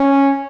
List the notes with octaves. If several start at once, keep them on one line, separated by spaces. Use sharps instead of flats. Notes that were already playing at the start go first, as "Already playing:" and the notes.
Already playing: C#4